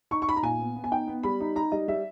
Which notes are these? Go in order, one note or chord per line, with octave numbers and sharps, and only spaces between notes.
D#4 C#6
C#6
D#4 B5
A#5
A#2 G#5
B3
B3
G#5
D#4 G5
B3
G3 B5
D#4
D#4 A#5
G3 D#5
G3 E5